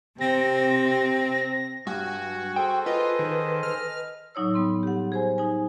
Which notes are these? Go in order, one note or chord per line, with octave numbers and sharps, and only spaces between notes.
C3 C4 G4 A#6
G2 F#4 F#5 G#5
G#4 A4 C5 G5
F4 B4 D#5
D#3
F6
A2 F#3 D#4 C#5 E6
G3 B3 C6
G4 F#5
G#4 C5 G#5
D#4 G#5